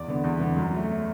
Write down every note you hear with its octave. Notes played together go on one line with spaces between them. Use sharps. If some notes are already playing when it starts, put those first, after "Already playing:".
Already playing: E2 D5
D3 B3
E2
D3 B3
F#2
F#3 A3